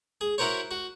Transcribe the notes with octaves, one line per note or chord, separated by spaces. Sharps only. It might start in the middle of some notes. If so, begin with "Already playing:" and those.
G#4
E4 F#4 A#4 C5 C#5
F#4